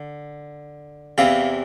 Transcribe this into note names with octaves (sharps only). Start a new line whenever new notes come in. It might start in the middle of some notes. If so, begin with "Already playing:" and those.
Already playing: D3
E2 C3 E3 F5